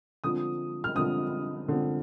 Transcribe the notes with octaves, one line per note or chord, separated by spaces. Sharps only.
D3 F3 C4 D#6
F6
D3 F3 C4 D#6
D3 F3 C4